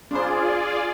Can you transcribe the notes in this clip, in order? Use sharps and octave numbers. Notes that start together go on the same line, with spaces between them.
D4 F4 G#4 C5 D5